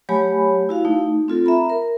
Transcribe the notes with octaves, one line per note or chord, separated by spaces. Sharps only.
F#3 A3 G4 C#5 G#5 B5
E4 F#4 F5
A3 D#4
C4 F4 A4
E5 A#5 B5
A#4